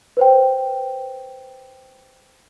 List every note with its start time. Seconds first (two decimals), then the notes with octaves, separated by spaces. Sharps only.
0.17 B4 C5 G5